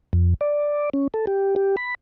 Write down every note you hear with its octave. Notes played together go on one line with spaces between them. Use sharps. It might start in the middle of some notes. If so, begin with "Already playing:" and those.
F2
D5
C#4
A4
G4
G4
B5